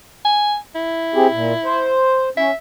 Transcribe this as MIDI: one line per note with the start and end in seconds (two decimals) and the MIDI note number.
0.25 0.57 80
0.75 1.96 64
1.15 1.27 60
1.15 1.27 67
1.15 1.27 68
1.32 1.53 46
1.65 2.29 72
2.37 2.51 61
2.37 2.54 76